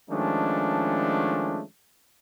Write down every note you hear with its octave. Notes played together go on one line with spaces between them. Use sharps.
D#3 F3 G#3 A3 C#4 D4